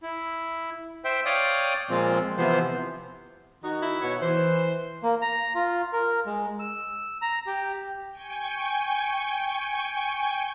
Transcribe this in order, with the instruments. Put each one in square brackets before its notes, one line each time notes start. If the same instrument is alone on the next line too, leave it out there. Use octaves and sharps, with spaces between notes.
[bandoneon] E4
C5 E5 G5
C#5 D5 F5 G5 D#6
A#2 F3 G#3 C4 F4
C3 E3 F3 B3 C5
[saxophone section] D#3 D#4 F#4
[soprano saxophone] E4
[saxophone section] B2 B4 C#5
[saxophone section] E3 [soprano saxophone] C5
[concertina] A#3
A#5
F4
A#4
G#3
E6
A#5
G4
[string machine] G5 G#5 C#6